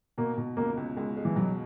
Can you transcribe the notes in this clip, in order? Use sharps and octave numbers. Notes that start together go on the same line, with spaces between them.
B2 A#3
B2
C#2 A#3
C#2
C#2 G#3
G#3
E3
B2 F#3